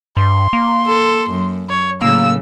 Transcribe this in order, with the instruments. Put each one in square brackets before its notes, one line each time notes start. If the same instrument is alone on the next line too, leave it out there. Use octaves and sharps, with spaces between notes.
[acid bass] G2 [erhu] C6
[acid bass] A#3
[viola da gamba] A4
F#2
[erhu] C#5
[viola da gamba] A2 C#3 F#3 [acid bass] A#3 [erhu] E6